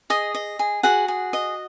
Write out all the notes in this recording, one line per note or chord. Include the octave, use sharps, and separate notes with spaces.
G#4 D#5 D#6
D#5
G#4
F#4 G#4 F#5
G#4
D#5